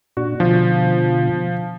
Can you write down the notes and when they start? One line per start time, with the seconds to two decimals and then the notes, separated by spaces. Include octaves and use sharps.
0.17 A#2 D4 F#4
0.40 B2 D3 F3